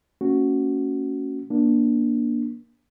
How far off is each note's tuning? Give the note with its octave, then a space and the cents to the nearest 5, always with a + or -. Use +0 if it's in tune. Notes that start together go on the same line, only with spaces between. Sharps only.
A#3 -30 C#4 +0 F#4 +0
A#3 +30 D4 +0